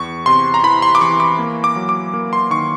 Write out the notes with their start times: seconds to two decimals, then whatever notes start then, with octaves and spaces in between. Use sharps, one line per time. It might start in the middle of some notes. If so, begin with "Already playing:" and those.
Already playing: E2 C#6
0.26 C3 C6
0.54 A#5
0.63 E3 B5
0.82 C6
0.95 D6
1.01 E3 C#6
1.20 D6
1.39 A#3
1.64 D6
1.76 F#3
1.89 D6
2.14 A#3
2.33 C6
2.50 D#3 C#6